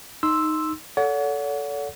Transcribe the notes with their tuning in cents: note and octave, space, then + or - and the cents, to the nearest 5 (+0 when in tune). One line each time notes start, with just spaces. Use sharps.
D#4 +0 C6 +0 E6 +0
A4 +0 C#5 +45 F#5 -20